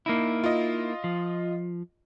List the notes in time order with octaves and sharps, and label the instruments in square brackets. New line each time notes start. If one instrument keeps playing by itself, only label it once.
[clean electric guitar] A#3 D#4 E4
[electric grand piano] F4 D#5
[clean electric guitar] F3